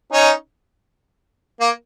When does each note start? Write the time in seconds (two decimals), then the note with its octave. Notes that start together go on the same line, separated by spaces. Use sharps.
0.13 C#4 D#4
1.60 A#3